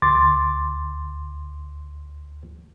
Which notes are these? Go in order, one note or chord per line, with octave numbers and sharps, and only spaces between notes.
D2 C6 D6 A6